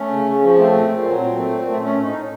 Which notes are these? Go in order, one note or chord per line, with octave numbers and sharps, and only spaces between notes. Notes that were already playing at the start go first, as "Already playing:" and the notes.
Already playing: A3 C#4
C#3
C#3
F3
A3 C4
A#2
A#2
F#3
A#2 C4
A3
A#2
A3
A3 C#4
A2
D#4
A2